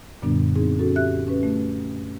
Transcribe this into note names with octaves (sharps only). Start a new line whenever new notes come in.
F#2 A#2 D3 G3 B3 D4
C4 D#4 G#4
C#4 F#4 A4
G4 E5 F#6
C#4 B4
A3